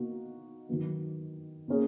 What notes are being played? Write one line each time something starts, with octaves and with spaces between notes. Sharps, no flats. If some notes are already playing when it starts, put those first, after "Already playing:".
Already playing: B2 A#3 D#4 F#4
D#3 F#3 B3
B2 A#3 C#4 G#4